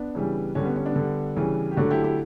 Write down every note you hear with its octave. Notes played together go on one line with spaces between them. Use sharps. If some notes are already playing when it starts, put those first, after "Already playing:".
Already playing: B3 D4
C#3 E3 G3
D3 G3 C#4
B3
C#4
B3 D4
D3 G3
C#3 E3 G3
G4
D3 F#3 A3 D4 F#4
E4 G4
E4 G4